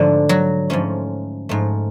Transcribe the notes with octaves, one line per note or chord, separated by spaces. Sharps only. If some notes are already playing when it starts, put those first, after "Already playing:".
Already playing: G#2 D3 F3 A3 D4
F#3 F#4
G#2 F3 A3 C#4
G#2 F3 A3